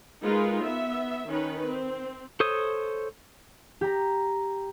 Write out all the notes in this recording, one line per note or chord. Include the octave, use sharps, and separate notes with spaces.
G#3 D#4 F4 G#4 A#4 B4
B3 E5
D#3 C#4 D#4 B4
C4
A4 C5 C#5 D#6
G4 A#5